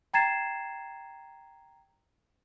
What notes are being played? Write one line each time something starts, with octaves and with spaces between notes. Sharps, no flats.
G5 A#5 G#6 A6 C7 E7